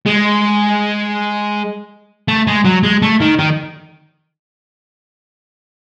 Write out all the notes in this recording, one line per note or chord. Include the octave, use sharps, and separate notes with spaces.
G#3
A3
G#3
F#3
G#3
A3
D#3
D#3